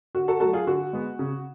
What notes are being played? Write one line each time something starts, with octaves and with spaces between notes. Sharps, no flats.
D3 F#4
F#4 A4
F#3 A3 F#4 A4
F4 G#4
D3 F#4
G#3 B3
C#3